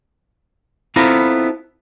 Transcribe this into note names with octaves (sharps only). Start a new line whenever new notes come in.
B3 C4 E4 F4 A4 A#5